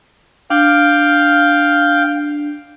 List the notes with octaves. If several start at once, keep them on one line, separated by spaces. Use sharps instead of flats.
D4 F5 G5